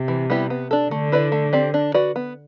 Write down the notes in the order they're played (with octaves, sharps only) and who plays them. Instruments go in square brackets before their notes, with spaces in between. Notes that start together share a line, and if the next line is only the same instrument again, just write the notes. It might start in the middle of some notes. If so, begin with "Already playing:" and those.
Already playing: [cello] C3
[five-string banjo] E3
G3 B3 E4 G4
B3
D4 A4
[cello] D3 [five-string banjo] A3
[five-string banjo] E4 B4 D5
A3
C4 G4 D5
D4
F#4 B4 D5
B3